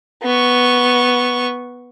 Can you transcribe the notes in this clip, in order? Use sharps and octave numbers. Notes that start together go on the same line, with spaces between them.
B3 C#6